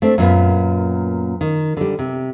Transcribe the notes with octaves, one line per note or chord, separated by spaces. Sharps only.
A3 C4 D4
F#2 A#2 B3
D#3
D3 G3
C3